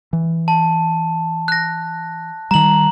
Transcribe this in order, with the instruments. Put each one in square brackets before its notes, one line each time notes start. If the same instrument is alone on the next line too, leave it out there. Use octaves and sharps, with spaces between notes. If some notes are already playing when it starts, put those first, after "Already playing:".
[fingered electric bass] E3
[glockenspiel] A5
F#6 A#6
[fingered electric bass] D#3 G3 [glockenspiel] A#5 F#7